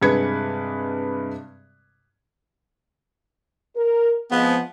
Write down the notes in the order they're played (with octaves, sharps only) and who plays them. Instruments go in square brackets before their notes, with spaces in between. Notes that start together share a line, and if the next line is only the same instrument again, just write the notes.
[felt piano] G2 C3 G#3 B4 G#6 C#7
[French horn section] A#4
[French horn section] F3 G#3 C4 [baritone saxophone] B3